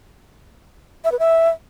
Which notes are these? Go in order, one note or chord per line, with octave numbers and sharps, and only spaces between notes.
E5
B4
E5